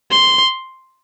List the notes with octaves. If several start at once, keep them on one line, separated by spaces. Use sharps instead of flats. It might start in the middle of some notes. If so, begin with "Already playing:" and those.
C6